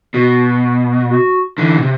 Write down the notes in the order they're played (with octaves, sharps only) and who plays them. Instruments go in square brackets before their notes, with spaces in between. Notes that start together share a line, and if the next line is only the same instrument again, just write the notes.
[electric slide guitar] B2 [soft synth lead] F#4
[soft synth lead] F#4
[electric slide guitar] D3 E3
B2
C3